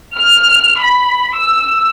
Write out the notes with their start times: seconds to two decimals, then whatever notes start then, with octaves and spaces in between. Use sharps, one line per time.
0.17 F6
0.81 B5
1.36 E6